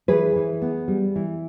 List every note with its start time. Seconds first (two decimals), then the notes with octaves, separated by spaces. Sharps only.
0.08 E3 G#4 B4
0.36 E3
0.62 B3
0.88 G3
1.16 E3